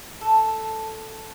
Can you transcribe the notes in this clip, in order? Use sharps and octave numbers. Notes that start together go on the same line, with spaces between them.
A4